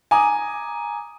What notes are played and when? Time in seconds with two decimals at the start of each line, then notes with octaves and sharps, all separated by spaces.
0.11 G#5 A#5 D6 D#6